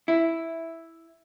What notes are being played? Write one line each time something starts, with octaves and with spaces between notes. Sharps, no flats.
E4